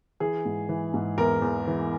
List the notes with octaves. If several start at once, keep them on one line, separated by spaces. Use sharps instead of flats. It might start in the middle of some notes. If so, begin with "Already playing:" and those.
E3 G#4
G#2
E3
G#2
E2 A#4
E2
E3